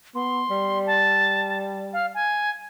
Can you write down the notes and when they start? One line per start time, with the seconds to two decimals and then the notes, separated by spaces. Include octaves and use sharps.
0.15 B3 C6
0.50 G3
0.87 A5
1.93 F5
2.14 G#5